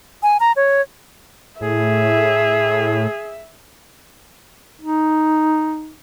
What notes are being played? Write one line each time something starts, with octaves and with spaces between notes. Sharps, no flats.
G#5
A#5
C#5
A2 G#4 E5
D#4